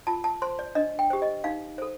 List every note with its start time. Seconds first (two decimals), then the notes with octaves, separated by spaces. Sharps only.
0.07 F4 A5
0.24 A5
0.42 C5 C6
0.59 D5
0.75 D4 D#5
0.99 G5
1.10 G4 C5
1.22 D#5
1.44 D#4 F5
1.78 A4 C5